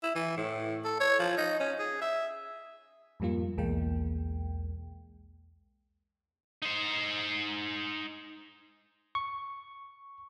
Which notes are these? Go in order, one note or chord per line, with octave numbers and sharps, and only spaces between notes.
E4
E3
A2
A4
C#5
F3
D#4
C#4
G#4
E5
F2 G#2 G3 A#3 F4
B1 E2 G#3 A#3 G5
D#4 C5
C#6